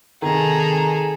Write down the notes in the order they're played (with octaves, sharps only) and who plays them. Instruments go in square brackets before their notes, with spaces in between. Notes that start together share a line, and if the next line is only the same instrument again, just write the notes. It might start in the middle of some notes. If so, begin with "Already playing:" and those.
[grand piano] C3 D#3 [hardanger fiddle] G#4 A4 [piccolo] A#5